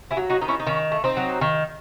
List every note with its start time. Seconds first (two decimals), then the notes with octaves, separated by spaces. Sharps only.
0.11 E4 G#4
0.17 F#3
0.30 D#4 F#4
0.41 D#3 D#4
0.48 C#4 E4
0.60 D#4
0.67 D#3 C#4
0.92 A3
1.04 C4 D#4
1.17 F#3
1.41 D#3